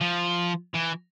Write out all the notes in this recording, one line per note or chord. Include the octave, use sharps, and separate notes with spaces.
F3
E3